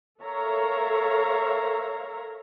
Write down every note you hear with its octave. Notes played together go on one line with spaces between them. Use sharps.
A4 A#4 C#5 E5 F5 A#5